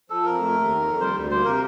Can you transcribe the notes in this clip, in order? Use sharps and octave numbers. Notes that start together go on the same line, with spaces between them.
F3 A4
F2 A#4
A3
D#2
D#3
F2
G3 C5
D2
A#3 C5
C3 A#4